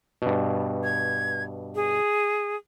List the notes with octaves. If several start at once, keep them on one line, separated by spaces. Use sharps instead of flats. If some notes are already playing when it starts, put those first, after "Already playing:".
G2 B2
G#6
G#4